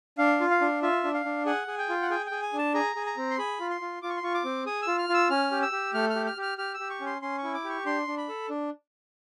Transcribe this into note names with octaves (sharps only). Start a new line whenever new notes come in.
D4 F5
F4
F5
D4
F4 E5
D4
F5
D4
G#4 F#5
G#4
G5
F4
F#5
G#4 G5
G5
G#4
G#5
D4
A5
G#4 A#5
G#4
A#5
C4
C6
G#4 B5
F4
C6
F4
F4 D6
C#6
C6
F4 C#6
D6
C4
G#4 D#6
E6
F4
F6
F4 E6
C#4 F6
G4
E6
G4
A3 F6
F6
G4
F6
G4 F6
G4 F6
E6
G4
C#6
C#4
C6
C#4 C6
C#6
E4
D6
G4
C#6
D4 C6
D4
B5
A4
D4